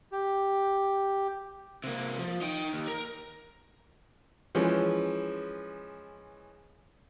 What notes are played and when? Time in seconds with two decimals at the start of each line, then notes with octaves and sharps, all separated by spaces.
0.12 G4
1.84 C3 A#3
2.19 F3
2.42 D#4 G5
2.73 D#2
2.88 A#4
4.55 E3 F3 G#3 C#4